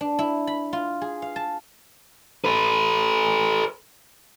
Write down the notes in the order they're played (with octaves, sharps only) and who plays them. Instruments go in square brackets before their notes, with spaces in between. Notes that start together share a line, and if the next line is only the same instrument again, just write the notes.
[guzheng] D4
E4
B5
F4
G#4
F5
A5
[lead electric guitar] A4 B4